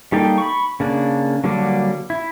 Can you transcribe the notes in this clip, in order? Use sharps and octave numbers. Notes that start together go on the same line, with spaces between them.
G3 A#3 D#4 A4 G5
B5 C#6
C#3 A#3 D4
D3 F#3 G3 A#3 D4
E4